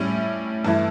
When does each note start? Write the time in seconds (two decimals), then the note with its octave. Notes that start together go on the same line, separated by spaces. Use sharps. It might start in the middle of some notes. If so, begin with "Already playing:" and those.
Already playing: A2 G3 C#4 E4
0.65 G2 E3 A3 E4